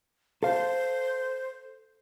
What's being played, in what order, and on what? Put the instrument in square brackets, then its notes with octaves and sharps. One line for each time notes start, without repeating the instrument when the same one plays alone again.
[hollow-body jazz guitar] A4 F5 [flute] C5